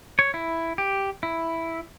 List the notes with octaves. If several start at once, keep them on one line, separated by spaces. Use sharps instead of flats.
C#5
E4
G4
E4